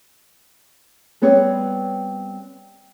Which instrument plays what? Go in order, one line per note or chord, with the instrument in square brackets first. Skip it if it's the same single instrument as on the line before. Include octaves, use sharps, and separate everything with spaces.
[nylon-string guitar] G3 B3 C4 C#5